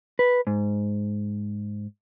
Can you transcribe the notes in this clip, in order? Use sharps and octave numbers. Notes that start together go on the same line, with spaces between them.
B4
G#2